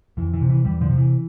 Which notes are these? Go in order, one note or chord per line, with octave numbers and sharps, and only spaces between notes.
F2 E3
E3
C3
E3
E2 E3 G3
D3 F3
C3
E3